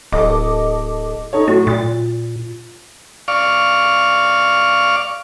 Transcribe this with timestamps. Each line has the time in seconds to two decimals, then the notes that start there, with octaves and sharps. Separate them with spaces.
0.12 D1 A4 D#5 D6
1.33 D#4 A4 C#5
1.48 A2 F#3 F#4
1.67 A#2 A6
3.28 D5 F5 C#6